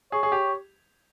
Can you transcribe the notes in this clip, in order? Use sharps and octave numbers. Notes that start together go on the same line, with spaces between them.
G#4 C#5
G#4
G4